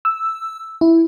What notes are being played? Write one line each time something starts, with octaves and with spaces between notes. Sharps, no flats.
E6
E4